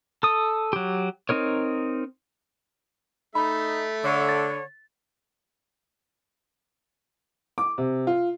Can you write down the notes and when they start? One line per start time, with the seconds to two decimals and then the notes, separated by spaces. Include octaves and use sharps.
0.23 A4 D#6
0.73 F#3 G4
1.29 C4 D#4 A#4 C#5
3.35 A3 D#4 E5 B5
4.04 D3 C#5
4.29 A6
7.58 D6
7.78 C3
8.07 F4